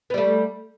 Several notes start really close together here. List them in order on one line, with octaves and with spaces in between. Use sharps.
B3 G3 A3